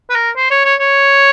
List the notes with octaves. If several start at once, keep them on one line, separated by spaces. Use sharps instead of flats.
B4
A#4
C5
C#5
C#5
C#5